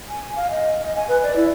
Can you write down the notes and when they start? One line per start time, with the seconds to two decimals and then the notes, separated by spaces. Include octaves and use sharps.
0.09 G#5
0.36 F5
0.51 D#5
0.82 D#5
0.96 G#5
1.08 B4
1.23 D5
1.36 E4